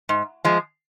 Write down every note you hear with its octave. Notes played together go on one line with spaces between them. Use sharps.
G#2
F3 G#3